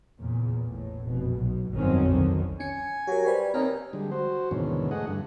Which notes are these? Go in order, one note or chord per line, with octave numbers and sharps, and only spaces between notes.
E2 A#2 C#3
A1 A2
F1 B2
B1 B2
G1 F2 D#3 F#3 C4 C#4
B1 D3 D#3
C#4 G#5 C#7
F#3 G4 A#4
G3 B4 C5
D#2 C4 A#5 F6
D3 G3 G#3
F#4 C5
D#2 G#2 B2 D3 E3 C#4
A3 G#4 D#5 F#5
G2 D3